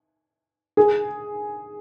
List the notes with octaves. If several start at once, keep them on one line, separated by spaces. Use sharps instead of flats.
G#4